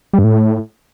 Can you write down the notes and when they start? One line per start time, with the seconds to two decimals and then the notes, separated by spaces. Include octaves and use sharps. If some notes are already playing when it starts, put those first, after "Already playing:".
0.13 G3
0.19 G2
0.24 A2